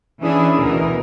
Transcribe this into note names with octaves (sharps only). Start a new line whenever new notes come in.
E3 C#4 D4 E4 G#4
D2 B2 E3 A#4